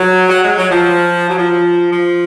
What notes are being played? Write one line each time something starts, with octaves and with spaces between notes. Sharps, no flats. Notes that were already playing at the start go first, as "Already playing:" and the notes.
Already playing: F#3
F#3
G#3
F#3
F3
F#3
F3
F3